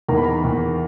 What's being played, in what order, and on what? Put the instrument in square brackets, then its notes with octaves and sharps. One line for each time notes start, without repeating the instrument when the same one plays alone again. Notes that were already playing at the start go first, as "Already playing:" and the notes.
[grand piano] E2 D#3 A#3 A#5
B5
A#5
E2 D#3 A#3